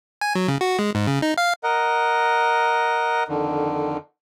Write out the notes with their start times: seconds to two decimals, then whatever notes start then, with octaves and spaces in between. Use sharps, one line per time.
0.21 G#5
0.35 F#3
0.48 C#3
0.61 F#4
0.79 G#3
0.95 G#2
1.07 C#3
1.22 D#4
1.38 F5
1.63 A#4 D#5 F#5
3.28 F2 D3 D#3